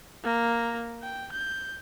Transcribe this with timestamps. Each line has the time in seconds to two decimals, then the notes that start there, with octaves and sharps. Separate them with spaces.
0.24 A#3 A#5
1.03 G5
1.32 G6